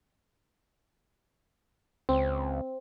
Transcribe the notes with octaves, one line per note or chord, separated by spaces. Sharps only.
C#2 C4